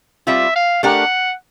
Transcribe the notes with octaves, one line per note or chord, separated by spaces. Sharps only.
G3 C4 F4 E5
F5
A3 D4 G4 A#4 F#5